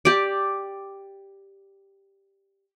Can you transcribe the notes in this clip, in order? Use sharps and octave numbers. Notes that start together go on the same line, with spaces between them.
G4 D5